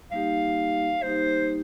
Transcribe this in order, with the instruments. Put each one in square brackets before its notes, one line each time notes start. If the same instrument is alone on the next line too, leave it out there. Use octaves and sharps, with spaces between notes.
[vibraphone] G3 A#3 D#4 G4 [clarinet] F5
[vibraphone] G3 A#3 D#4 G4 [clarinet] C5